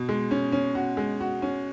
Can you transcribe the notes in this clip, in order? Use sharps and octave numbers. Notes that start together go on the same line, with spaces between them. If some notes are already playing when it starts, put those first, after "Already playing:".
Already playing: B2
G#3
C#4
C#4
F#4
G#3
F#4
C#4